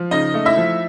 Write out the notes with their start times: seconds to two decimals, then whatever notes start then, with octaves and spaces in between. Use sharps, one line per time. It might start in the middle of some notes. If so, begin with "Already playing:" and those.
Already playing: F3
0.11 C#3 D#4 D#5
0.34 A3
0.45 E4 E5
0.57 F3